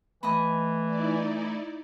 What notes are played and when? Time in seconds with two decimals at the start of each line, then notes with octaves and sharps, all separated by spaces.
0.23 E3 A3 D#5 A5 B5
0.85 D#4 E4 D5